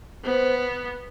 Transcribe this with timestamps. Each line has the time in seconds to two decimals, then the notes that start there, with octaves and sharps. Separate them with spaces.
0.24 B3 C5